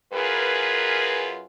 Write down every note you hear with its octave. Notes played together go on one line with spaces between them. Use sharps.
F#2 F4 G#4 A#4 B4